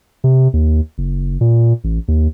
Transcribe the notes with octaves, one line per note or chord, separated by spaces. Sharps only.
C3
D#2
F#1
A#2
A1
D#2